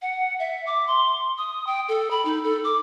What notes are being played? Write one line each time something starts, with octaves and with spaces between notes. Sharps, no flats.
F#5
E5
D6
C6
D#6
G5
A4
B5
D#4
A4
D6